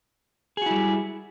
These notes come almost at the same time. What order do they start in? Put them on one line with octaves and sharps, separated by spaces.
G#4 F#4 E4 G3